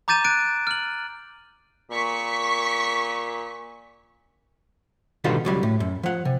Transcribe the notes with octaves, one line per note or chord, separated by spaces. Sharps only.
A#5 D6 G6 A6 D#7 E7
F#6 A6 D7 D#7
F6 F#7
A#2 C#6 B6
B2 D3 D#3 G3 F4 F#4
C#2 F#3 G3
A2
F#2
F3 F#5
C3